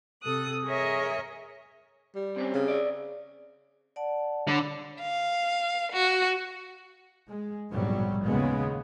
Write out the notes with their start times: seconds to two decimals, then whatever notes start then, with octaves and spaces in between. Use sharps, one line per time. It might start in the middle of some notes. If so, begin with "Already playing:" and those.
0.22 C3 A4 D#6 F#6
0.65 G#4 A#4 C#5 D#5 E5
2.15 G3
2.36 C3 C4 C#4
2.54 C#3
2.68 D5 E5
3.96 D5 F#5 A5
4.48 D3 C#5 B5 D6
5.00 F5
5.92 F#4
7.28 G#3
7.71 A#1 F2 G#2 B2 F#3 G3
8.25 D#2 C#3 G#3 B3